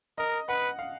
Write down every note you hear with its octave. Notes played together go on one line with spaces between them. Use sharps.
A#4 D#5
B4 F#5
F5